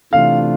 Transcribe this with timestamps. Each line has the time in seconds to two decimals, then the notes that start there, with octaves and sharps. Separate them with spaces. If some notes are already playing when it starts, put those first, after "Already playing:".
0.12 C3 E3 A3 D4 F4 F5